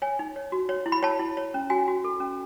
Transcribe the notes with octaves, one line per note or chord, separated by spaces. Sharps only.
C#5 G#5
D#4
C#5
F#4
C#5
E4
B5
C#5 A5
E4
C#5
C#4
F#4 G#5
F#4
A4
C#4